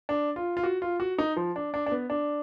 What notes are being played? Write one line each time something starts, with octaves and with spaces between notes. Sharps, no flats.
D4
F4
F4
F#4
F4
F#4
D#4
F3
D4
D4
D4
B3
D4